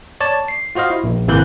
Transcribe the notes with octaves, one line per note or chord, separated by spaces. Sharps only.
C#5 D5 A5
C7
F4 F#4 C5 D#5 F5
E4
A#1
G#1 C3 E3 A#3 F#6 G6